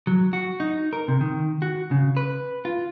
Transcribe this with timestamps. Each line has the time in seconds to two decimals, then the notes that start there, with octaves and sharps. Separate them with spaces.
0.07 F#3
0.33 F#4
0.60 D#4
0.93 A#4
1.08 C3
1.21 D#3
1.62 F#4
1.91 C#3
2.17 B4
2.65 F4